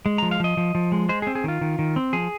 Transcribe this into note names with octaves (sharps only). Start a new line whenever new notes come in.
G#3
A#5
F3
F5
F3 D#5
F3
F3
G#3
G#3 C5
G#4
C4
G#4
D#3 F4
D#3
D#3
C4
F3 G#4